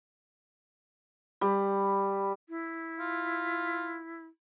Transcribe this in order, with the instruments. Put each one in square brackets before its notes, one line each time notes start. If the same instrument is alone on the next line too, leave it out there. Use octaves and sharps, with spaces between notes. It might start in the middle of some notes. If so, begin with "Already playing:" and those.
[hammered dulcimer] G3
[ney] E4
[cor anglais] F4